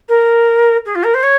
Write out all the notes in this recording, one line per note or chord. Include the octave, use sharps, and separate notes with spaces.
A#4
G#4
F4
A#4
C5
C#5